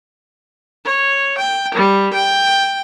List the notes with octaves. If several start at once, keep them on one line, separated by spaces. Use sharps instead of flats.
C#5
G5
G3
G5